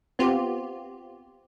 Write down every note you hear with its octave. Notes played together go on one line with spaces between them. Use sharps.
B3 C4 F4 G4